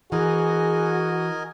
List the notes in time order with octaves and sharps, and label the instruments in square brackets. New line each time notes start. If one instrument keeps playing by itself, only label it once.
[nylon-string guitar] E3 [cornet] F#4 [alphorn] G#4 [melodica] A#4 D#5 G#5